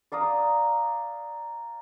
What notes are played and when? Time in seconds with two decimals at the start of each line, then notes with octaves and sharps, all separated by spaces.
0.12 D5 F5 A#5 D#6